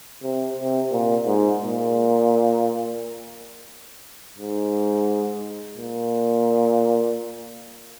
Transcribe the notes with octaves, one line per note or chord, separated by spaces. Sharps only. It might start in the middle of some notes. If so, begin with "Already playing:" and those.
C3
C3
A#2
G#2
A#2
G#2
A#2